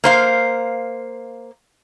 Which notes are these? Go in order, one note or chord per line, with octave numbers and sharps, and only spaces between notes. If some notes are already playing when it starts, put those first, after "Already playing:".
A#3 C5 F5